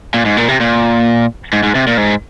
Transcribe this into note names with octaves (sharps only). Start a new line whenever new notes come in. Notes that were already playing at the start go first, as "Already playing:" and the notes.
A#2
G#2
A#2
C3
A#2
G#2
G#2
C3
A#2
G#2